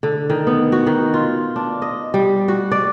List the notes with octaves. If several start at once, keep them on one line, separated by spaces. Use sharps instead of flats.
D3
D#3
B3
F#4
D#3
F4
D4
D#5
G3
F#4
D5